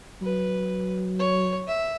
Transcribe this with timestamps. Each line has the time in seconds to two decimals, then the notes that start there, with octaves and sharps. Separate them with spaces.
0.22 F#3 B4
1.20 C#5
1.68 E5